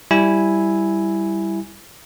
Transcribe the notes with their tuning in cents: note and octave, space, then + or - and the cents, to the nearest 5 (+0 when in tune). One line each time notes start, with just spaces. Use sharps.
G3 +0 E4 +0 G#5 +0